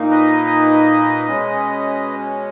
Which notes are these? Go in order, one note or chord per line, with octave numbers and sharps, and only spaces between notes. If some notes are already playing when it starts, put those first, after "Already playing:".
Already playing: A#2 A#3 D#4
B4 D#5
B2 G#3 C#4